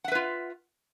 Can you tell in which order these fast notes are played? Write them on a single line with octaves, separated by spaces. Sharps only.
F#5 E5 B4 F4